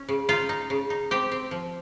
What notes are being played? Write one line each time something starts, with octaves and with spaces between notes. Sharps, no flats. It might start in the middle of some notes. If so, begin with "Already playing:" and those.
Already playing: C#4
C#3
D#4 F4
D#4
C#3
D#4
C4 G4
C4
F3